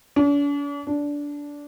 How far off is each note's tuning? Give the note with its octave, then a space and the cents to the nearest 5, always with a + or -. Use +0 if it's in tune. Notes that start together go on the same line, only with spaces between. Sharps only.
D4 -45
D4 -15